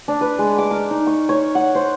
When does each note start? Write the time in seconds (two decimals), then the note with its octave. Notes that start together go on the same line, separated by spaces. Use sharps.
0.08 D4
0.21 B4
0.39 G#3
0.58 D6
0.71 A#4
0.91 D#4
1.07 C#6
1.29 C#5
1.55 F#5
1.75 C5